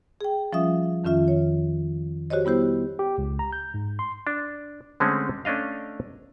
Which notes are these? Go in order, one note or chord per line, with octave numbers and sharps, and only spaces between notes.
G#4 G5
F3 G3 C#4 F4 E5 D#6
F2 D#3 C#4 F4 E5
C#5
F#4 G4 C5 C#5 D#5
G3 B3 E4 G4 C5
G4
C#2
A#5
G6
G#2
C6
D4
D3 G#3 A3 C4 C#4
A3 C#4 D4 D#5 F5